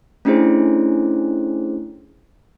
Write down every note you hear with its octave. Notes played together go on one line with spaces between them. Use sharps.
A3 C#4 D4 E4 G#4 C5